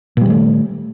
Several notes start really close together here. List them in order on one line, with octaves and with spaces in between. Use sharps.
A#2 G3 D#3 A3